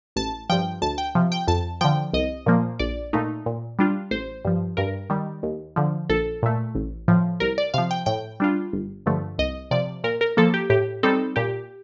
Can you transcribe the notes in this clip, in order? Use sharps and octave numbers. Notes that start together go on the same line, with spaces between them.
A1 A5
G2 F3 G5
D2 A5
G5
C3 F3
G5
F2 A5
D3 F3 G5
C2 D#5
A#2 F3 A#3
A#1 D5
A#2 A3 D#4
A#2
G3 D4 F4
A1 C5
G2 F3
G2 A#4
D#3 G3
D#2
D3 F3
A#1 A4
A#2 A3
A1
A2 F3
C2 A#4
D5
C3 F3 F5
G5
A2 G5
G3 D4 F4
G1
G2 D3 F3 A3
C2 D#5
C3 F3 D5
A#2 A#4
A#4
F3 A#3 A4
G4
A2 G4
G3 C4 D#4 A4
A#2 G4